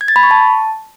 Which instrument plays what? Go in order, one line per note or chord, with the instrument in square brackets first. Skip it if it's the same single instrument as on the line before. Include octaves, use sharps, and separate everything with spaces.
[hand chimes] G#6
A6
B5
C#6
A5